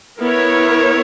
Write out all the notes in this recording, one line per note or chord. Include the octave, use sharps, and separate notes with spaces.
B3 E4 A#4 C#5